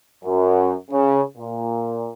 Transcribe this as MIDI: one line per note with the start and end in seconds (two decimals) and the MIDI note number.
0.24 0.74 42
0.91 1.22 49
1.37 2.10 46